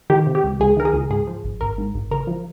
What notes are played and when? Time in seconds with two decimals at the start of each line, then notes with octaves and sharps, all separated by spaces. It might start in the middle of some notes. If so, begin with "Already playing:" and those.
0.10 D#3 G4
0.27 C3
0.35 G4
0.44 C#2
0.60 C#2 G#4
0.77 D#3 A#4
0.85 G#4
0.93 C#2
1.10 G#2 G#4
1.27 F3
1.44 G#1
1.61 G#1 A#4
1.78 G#2
1.95 G#1
2.11 C#3 A#4
2.27 F3